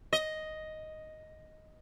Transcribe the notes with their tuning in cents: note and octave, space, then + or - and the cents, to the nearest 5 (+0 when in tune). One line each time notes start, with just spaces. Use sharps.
D#5 +5